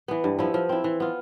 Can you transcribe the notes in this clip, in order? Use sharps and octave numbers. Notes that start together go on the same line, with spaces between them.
E3 B3
G2
F3 B3 E4
F3
C4 E4
E3
B3 F4